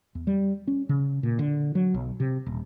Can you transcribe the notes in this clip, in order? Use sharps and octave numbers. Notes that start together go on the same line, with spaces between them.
E2
G3
C#4
C#3
A#2
D3
F#3
B1
C3
D#1